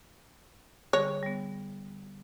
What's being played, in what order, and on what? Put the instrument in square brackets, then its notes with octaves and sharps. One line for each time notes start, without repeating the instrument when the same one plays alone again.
[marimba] D3 G3 G#4 [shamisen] C#5
[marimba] G3 B3